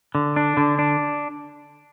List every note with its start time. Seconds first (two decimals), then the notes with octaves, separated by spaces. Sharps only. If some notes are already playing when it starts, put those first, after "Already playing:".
0.15 D3
0.36 D4
0.57 D3
0.79 D4